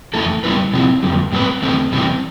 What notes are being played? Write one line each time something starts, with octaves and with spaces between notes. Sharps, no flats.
F2 E3 A3 E4 A4
G3 B3 E4 B4
C3 F3 C4 E4 G4
F2 D3 G3
A2 G3 C4 G4 B4
E2 D3 A3 C4
E2 C3 E3 G3 C4